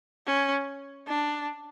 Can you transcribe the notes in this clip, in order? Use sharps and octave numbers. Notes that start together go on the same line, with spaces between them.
C#4
D4